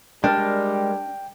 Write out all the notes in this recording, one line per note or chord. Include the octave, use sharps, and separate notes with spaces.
G3 G#3 D4 A#4 G5 F6